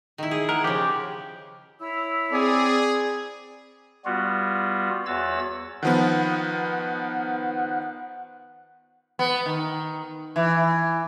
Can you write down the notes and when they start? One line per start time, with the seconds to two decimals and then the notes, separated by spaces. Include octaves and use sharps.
0.18 D#3 E4
0.31 G#4
0.49 A#4 F#5
0.64 C#3 F3 G4
1.79 E4 C#5 E6
2.32 C4 G#4 D5
4.05 G3 B3 F4 F#4
5.06 E2 F#4 C#5 E6 A6
5.83 D#3 F3 B3 F#5
9.19 B3
9.46 D#3
10.36 E3